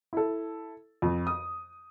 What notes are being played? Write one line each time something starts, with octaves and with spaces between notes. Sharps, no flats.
E4 A4
F2
D#6